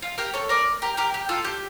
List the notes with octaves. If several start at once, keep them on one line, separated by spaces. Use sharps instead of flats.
F4
G4 A#4
A4 C#5
A#4 D5
G4 A#4
G4 A#4
G4
F4 A4
G4